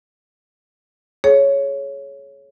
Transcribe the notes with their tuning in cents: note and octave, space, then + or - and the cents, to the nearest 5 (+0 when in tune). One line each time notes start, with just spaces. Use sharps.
G#4 +30 C#5 +0